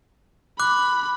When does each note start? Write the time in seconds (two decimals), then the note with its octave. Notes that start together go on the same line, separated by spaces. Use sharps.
0.60 B5 D6 F#6